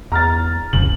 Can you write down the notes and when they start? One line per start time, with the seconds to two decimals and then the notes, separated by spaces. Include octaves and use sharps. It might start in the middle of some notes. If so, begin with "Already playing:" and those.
0.12 E2 A#5 F6 A6
0.73 D#1 C2 F2 C#3 F#7